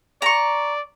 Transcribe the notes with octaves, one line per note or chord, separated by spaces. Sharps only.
D5 A#5 C#6